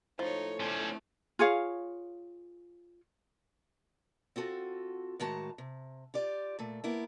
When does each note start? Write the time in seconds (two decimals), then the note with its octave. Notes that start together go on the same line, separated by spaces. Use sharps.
0.19 A2 F3 D#4 C#5 A#5
0.60 E3 A3 C#4 D4 C5
1.39 F4 G#4 C#5 F5
4.36 C4 F4 F#4 A4
5.20 A2 D#3 G#3 F#4 A5 A#5
5.58 C3
6.14 F4 G4 D5
6.59 A#2 A3
6.84 A#3 B3 E4